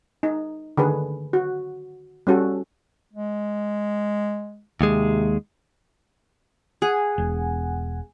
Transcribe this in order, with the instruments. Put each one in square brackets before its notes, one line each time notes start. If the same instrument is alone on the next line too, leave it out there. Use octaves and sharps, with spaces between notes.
[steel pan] D#4
D3 D#3 G#4 B4
F#4
G3 C#4 F#4 A4
[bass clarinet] G#3
[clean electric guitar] D#2 G#3 [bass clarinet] C3
[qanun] G#4 [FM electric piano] F#5 G#5
[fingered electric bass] E1